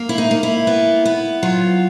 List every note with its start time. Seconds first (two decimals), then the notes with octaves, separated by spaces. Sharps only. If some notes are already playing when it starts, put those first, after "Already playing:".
Already playing: A#3
0.09 E4
0.18 D#4
0.31 A#3
0.43 E4
0.67 B3
1.05 B3
1.43 F#3 F4